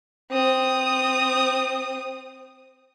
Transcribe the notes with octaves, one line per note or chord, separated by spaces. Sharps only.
C4 D#6